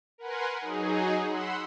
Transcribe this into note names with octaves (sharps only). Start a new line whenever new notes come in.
A#4 B4 F#5 G#5 C6
F#3 D#4 G#4
F#5 B5 C6 E6